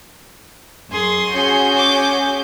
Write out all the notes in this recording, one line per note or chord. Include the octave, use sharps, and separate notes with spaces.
F#2 G#4 C6
C#4 F#4 G#4 G#5 G6
D6